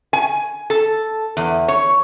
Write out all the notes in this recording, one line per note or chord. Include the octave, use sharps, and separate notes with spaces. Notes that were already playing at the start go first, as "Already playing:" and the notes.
G#5
A4
E2
C#5